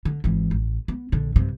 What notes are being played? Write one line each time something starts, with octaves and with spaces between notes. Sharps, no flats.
D3
G#1 E3
A1
B3
A#1 D3
G2 C3